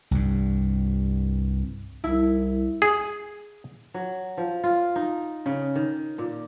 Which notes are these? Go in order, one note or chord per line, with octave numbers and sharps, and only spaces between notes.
C2 G2
C2 E4
G#4
F#3
F3
F4
D#4
C#3
D#3
A#2